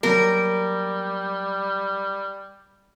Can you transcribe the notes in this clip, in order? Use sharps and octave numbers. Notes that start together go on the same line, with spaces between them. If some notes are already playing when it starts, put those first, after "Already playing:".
F#3 G3 A#3 A#4